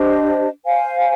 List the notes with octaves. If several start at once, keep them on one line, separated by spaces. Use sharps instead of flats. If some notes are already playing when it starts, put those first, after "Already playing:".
Already playing: D4 G4 C5 D#5
C5 F5 G#5